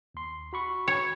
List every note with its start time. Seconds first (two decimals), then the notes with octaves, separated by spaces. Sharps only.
0.14 D#2 C6
0.53 F#4 B5 C#6
0.88 C#5